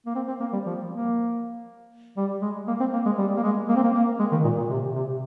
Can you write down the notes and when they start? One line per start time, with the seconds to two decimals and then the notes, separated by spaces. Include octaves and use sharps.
0.06 A#3
0.15 C4
0.28 C4
0.40 A#3
0.53 G3
0.66 F3
0.91 A#3
2.17 G3
2.42 G#3
2.67 A#3
2.80 C4
2.93 A#3
3.05 G#3
3.18 G3
3.37 A#3
3.43 G#3
3.69 A#3
3.76 C4
3.83 A#3
3.94 A#3
4.19 G#3
4.32 D#3
4.44 A#2
4.58 A#2
4.70 C3
4.95 C3